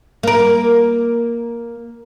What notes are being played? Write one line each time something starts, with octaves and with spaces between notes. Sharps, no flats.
A#3 A#4